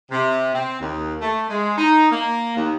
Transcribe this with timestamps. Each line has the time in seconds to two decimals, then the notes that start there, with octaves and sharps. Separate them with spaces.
0.12 C3
0.54 C4
0.80 D#2
1.21 A3
1.50 G#3
1.77 D#4
2.11 A#3
2.57 D#2